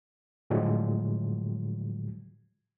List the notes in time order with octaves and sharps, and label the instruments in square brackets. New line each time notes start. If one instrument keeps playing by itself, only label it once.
[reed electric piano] A2 D3 F3 F#3 G#3